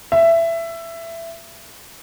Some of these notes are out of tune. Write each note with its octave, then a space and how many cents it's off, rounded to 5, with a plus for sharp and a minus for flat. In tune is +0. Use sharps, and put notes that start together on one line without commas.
E5 +15